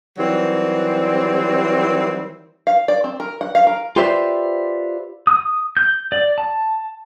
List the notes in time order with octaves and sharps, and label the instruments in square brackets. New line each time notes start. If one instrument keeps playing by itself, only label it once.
[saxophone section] D#3 E3 F#3 G3 C4
[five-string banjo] F5
D5
C4
A#4
F#5
F5
A#4
[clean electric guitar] F4 G4 B4 C5 D5 E5
[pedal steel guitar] D#6
G6
D5
A5